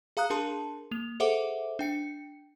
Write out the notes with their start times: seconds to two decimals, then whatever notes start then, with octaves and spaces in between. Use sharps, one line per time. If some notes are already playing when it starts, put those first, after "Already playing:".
0.17 G#4 F5 A#5 D#6 F#6
0.30 D4 G#4 A#4 A5 C6
0.91 A#3 F7
1.20 G#4 A4 C5 E5 F#5 D6
1.79 D4 G5 C#7